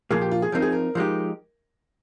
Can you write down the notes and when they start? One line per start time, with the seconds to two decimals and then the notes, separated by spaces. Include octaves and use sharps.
0.10 A#2 F3 A#3 G#4
0.21 G4
0.31 F4
0.42 G#4
0.52 F3 C4 D#4 A#4
0.62 G#4
0.72 A#4
0.95 F3 G#3 D#4 G4